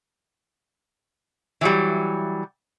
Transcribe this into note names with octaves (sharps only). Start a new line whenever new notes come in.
E3 F#3 G3